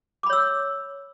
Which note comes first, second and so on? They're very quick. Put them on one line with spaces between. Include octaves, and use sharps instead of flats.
D6 B5 C#5 E6